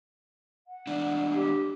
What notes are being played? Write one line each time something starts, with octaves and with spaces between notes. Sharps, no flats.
F#5
E2 D4
G4